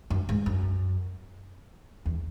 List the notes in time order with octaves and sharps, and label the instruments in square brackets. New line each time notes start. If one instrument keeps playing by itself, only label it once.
[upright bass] F#2
G#2
F#2
E2